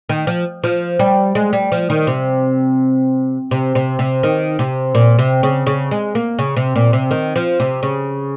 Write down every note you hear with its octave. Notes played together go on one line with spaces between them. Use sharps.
D#3
F3
F3
G3
G#3
G3
F3
D#3
C3
C3
C3
C3
D#3
C3
A#2
C3
C#3
C#3
G#3
A#3
C#3
C3
A#2
C3
D#3
F3
C3
C#3